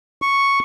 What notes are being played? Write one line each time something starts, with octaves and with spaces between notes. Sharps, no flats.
C#6